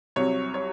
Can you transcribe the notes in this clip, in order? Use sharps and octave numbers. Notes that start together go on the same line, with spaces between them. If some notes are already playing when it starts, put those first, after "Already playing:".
C2 C3 F#3 C#5
C#5